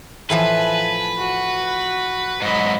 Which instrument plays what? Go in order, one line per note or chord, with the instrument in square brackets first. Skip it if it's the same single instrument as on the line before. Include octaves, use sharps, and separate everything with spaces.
[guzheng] A2 E3 F3 [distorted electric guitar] B4 [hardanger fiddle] G#5 A5
[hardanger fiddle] F#4
[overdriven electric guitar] G#2 F#3 [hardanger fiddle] D#5 B5